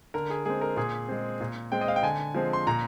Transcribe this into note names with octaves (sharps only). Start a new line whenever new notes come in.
D3 A#4
G#4
G#3 C4 G#4
A#4
A#2 G#4
G#3 C4
A#2
G#3 C4 G5
D#5
F5
G5
D3 G#5
F3 G#3 C4
C6
A#2 A#5